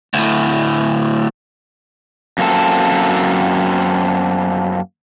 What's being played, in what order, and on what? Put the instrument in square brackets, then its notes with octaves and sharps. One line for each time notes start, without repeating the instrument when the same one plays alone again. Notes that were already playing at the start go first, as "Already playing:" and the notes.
[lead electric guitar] D2 A2
[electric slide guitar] F#2 A#3 C4 A4